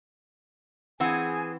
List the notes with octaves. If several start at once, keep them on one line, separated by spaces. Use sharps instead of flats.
E3 C4 G#4 F#5 G#5